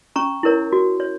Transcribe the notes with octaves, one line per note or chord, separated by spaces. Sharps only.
C#4 A#5 C#6
E4 A#4 C#5
F#4
C#5